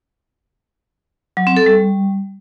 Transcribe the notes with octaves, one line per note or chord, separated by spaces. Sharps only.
F#3
C4
A4
G3